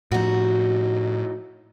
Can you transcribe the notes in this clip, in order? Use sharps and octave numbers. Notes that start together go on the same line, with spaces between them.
A2 F3 D#4 F#4